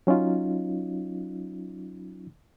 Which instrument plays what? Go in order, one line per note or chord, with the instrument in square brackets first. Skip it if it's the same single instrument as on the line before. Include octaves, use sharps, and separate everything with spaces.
[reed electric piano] F#3 C#4 D#4 F4